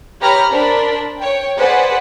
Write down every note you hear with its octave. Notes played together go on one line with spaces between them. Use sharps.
G4 B4 C#5 A#5 B5 F6
D4 A#4 C5 A5 B5
C#5 G5
G#4 B4 C5 D5 F#5